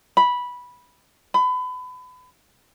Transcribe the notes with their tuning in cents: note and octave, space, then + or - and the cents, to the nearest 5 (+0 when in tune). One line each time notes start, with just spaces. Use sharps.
B5 -10
B5 +30